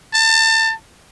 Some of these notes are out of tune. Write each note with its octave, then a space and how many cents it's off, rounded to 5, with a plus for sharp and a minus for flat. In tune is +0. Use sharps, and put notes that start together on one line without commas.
A5 +30